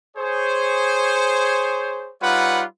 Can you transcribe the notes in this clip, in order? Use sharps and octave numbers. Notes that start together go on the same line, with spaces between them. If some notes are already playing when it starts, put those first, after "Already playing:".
G#4 C5 C#5
G3 D#4 F4 B4 C#5 F#5